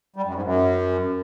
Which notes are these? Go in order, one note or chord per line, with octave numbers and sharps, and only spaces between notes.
G3
F#2
G#2
F#2